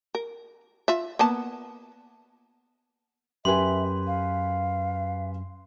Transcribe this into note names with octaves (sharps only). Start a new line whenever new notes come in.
A#4
F4 E5
A#3 B3 A5
F#2 G4 B4 E5 G#5 C6
F5